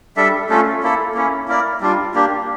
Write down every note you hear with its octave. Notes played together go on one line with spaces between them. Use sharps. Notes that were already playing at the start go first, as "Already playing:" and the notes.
G3 D4 A4 E5
A3 C#4 F4 A4
A#3 E4 A4
A#3 C#4 E4
A#3 E4 A#4 D5
G3 D4 F4
A#3 D4 G4